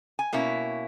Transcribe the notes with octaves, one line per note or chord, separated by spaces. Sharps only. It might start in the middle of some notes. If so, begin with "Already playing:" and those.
G#5
B2 A#3 C#4 E4